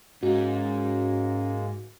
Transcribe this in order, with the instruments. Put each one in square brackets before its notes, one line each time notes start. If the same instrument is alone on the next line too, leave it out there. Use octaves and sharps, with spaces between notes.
[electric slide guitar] G#2 D#4 [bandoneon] G#3 A#3 [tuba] C#4 [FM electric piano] F#4